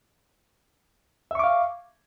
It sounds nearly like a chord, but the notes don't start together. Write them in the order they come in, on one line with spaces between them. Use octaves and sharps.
E5 C#6 D6 F5